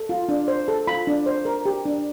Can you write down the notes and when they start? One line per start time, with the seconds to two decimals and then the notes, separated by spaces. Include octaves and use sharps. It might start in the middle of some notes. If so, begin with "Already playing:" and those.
Already playing: A4
0.09 F4
0.29 D4
0.48 C5
0.68 A4
0.87 F4 B5
1.07 D4
1.26 C5
1.45 A#4
1.65 G4
1.85 D4